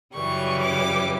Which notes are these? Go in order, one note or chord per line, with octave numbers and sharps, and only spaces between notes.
F#2 C#3 E3 G3 C#6
D6